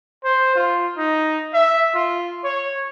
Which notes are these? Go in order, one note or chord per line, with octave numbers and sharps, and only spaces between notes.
C5
F4
D#4
E5
F4
C#5